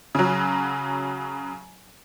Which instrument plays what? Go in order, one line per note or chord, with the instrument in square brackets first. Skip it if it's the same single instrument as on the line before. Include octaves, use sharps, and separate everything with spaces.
[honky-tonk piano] C#3 F#3